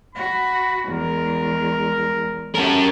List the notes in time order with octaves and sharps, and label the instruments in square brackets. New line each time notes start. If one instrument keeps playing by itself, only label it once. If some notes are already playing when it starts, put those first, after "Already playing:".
[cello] F#4 [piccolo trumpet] B5
[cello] E2 G#3 [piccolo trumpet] A#4
[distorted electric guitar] C#4 A#4 [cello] G4 A4